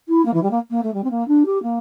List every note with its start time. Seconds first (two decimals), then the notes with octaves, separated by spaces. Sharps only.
0.08 E4
0.25 A#3
0.33 E3
0.42 G3
0.50 A#3
0.70 A#3
0.83 A3
0.93 G3
1.03 C4
1.10 A#3
1.27 D4
1.45 G4
1.62 A#3